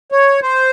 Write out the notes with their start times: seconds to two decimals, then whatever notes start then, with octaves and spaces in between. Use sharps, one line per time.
0.12 C#5
0.42 C5